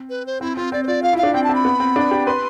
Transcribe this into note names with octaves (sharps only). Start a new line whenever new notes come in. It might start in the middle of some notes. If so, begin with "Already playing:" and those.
Already playing: C4
B4
C5
C4 E4
C4 F4
C4 D5
C5
F4 D5
F4 F5
E4
F5
D4
C4 G5
A5
C4
B5
B3
C4
D4
G4
B4 C6